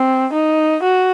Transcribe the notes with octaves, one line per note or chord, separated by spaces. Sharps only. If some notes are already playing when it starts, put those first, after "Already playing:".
Already playing: C4
D#4
F#4